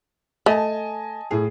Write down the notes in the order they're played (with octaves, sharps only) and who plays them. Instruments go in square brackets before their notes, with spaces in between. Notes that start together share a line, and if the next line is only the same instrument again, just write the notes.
[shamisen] A3 [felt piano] D#5 G#5 A5
[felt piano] A2 G#4